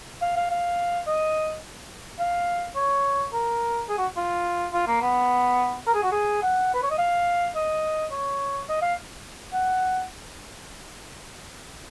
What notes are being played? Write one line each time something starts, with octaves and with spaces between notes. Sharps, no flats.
F5
F5
F5
D#5
F5
C#5
A#4
G#4
F#4
F4
F4
A#3
B3
A#4
G#4
F#4
G#4
F#5
B4
C#5
D#5
F5
D#5
C#5
D#5
F5
F#5